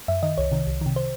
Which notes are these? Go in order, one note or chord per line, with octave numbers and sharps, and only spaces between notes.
F#2 E5
D#3 D#5
C2 C#5
C3 D#3
C2
C3 D#3
C5